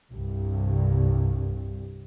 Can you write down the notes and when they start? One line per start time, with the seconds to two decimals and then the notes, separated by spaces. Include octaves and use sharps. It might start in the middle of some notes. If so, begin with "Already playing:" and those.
0.10 C2 G2